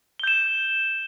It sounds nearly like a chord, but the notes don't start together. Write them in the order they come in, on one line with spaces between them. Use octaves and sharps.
G7 G6 E7